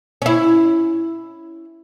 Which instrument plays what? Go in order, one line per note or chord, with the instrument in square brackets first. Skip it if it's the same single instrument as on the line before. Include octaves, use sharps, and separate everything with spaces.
[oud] C#4 E4